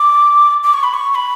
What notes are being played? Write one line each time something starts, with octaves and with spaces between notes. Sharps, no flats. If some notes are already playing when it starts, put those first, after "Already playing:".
Already playing: D6
D6
C#6
B5
C#6
C#6
B5